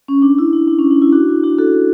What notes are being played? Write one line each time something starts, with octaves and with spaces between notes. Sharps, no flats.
C#4
D4
E4
D4
D4
C#4
D4
E4
D4 F#4
E4
D4 F#4
F#4 A4